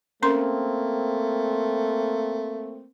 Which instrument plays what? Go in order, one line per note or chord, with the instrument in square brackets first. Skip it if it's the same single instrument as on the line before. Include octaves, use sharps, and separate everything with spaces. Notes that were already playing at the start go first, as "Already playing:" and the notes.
[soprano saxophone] A3 [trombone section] A#3 C4 [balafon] C#4 A#4 C6